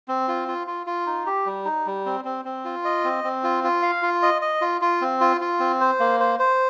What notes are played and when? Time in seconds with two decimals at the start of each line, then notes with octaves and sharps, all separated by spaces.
0.08 C4
0.28 F4
0.48 F4
0.67 F4
0.87 F4
1.06 D#4
1.26 G4
1.46 G3
1.65 D#4
1.86 G3
2.06 C4
2.25 C4
2.45 C4
2.65 F4
2.85 D#5
3.04 C4
3.24 C4
3.44 F4
3.64 F4
3.82 F5
4.02 F4
4.22 D#5
4.42 D#5
4.61 F4
4.81 F4
5.01 C4
5.21 F4
5.41 F4
5.60 C4
5.80 C5
6.00 A#3
6.20 C5
6.39 C5